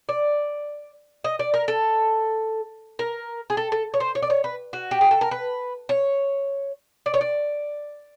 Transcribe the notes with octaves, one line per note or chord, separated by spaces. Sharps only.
D5
D#5
D5
A#4
A4
A#4
G#4
A4
A4
C#5
C5
C#5
D5
C#5
B4
F#4
G4
G#4
A4
A#4
B4
C#5
D5
C#5
D5